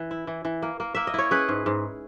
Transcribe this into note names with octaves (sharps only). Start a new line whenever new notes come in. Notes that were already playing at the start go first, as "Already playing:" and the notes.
Already playing: E3
E4
E3
E3
A#3
A#3
A#3 E5
D#5
E4 C#5
C#4 G#4 B4
G#2
G#2